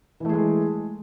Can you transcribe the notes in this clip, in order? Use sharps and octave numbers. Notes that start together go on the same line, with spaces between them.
E3 G#3 A3 G#4